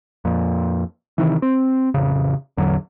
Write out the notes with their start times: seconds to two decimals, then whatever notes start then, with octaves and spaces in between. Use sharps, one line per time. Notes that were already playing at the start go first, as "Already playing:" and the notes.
0.25 F2 A#2
1.18 C3 D#3 E3
1.42 C4
1.94 A1 F2 C#3
2.57 A1 E2 D3 F#3